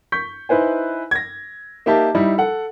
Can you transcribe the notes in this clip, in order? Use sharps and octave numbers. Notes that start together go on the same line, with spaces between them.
C#6 G6 B6
D#4 E4 B4 C5 G#5
G#6 A#6
A#3 D#4 G4 E5 A5
G3 D#4 E4
A4 F#5